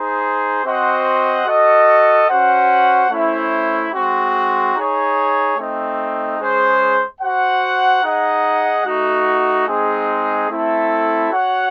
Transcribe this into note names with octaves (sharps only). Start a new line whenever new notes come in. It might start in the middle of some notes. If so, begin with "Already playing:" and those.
Already playing: D#4 G#4 C5
C4 F#4 C5 D#5 F#5
F#4 A4 D#5
C#4 F#4 C5 F#5
A3 C#4 E4 C5
G#3 C4 F#4
D#4 G#4 C#5
A3 C4 D#4
G#3 C#4 G#4 C5
F#4 C5 F#5
D#4 G#4 D#5 F#5
A3 D#4 F#4
G#3 C4 D#4 G#4
A3 C4 E4 A4
F#4 C#5 F#5